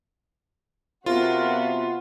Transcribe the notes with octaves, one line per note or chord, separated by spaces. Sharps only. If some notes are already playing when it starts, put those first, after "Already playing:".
C3 B3 F4 F#4 A#4 F5